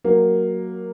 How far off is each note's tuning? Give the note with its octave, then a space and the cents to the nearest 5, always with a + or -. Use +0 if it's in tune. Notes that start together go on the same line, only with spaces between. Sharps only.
F#3 +0 A#3 +0